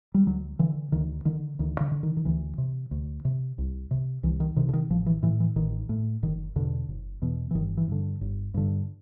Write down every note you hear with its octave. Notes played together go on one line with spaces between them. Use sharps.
G3
D2 F#3
D3 E3
D2 D#3
D3 D#3
D2 D#3
D3
D3
D#3
D#3
D2 E3
C3
D2
C3
C2
C3
C2 E3
D#3
C3 D#3
D3
D#3
A1 F3
E3
A2 E3
E3
A1 D#3
A2
F#1 D#3
E2 B2 D3
F#1
E2 B2
E3
G1 D#3
E3
G2 D3
G1
G2 D3